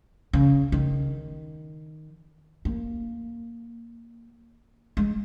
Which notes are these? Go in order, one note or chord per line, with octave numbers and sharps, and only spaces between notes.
C#3
D#3
A#3
G#3